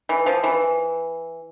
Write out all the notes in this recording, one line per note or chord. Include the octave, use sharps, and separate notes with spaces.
E3
F3
E3